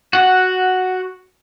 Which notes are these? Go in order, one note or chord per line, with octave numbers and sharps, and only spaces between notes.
F#4 F#5